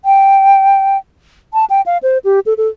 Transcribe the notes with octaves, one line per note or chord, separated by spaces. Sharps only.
G5
A5
G5
F5
C5
G4
A4
A4